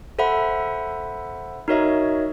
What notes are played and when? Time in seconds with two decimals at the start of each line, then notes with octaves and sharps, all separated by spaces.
0.19 A4 C5 E5 F#5 B5
1.68 D#4 F#4 A#4 C#5 D#5 E5